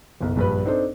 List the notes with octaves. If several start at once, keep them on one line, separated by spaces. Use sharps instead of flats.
F#1 B1
A#1 G2 B4
C4 D4 D#4 A4 C5